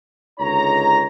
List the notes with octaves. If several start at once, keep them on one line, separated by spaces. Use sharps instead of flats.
C#2 D3 D#4 C#5 A#5